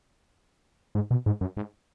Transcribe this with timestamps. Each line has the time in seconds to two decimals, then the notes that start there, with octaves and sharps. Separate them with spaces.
0.95 G#2
1.11 B2
1.26 G#2
1.41 F#2
1.57 G#2